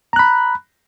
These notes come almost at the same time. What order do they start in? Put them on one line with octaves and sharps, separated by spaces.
A#5 F#6 B5